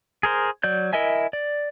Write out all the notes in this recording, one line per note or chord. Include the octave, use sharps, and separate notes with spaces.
G#4 A#4 C5
F#3 D5 G6
E4 A#4 D#5 E5 G#5
D5